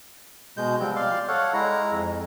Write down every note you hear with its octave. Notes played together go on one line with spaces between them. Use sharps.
B2 G#3 G6
C3 F3 G3 C4
D5 F5 C6
A4 C#5 F5 F#5
G#3 E4 A#5
F2